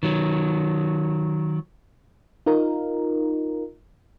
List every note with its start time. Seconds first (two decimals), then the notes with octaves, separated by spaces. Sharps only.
0.03 D#3 F#3
2.46 D#4 F4 A#4